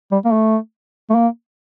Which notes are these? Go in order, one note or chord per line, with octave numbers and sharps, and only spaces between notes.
G3
A#3
A3
A3
A#3